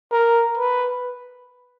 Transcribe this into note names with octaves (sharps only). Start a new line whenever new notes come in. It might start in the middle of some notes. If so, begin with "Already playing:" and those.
A#4
B4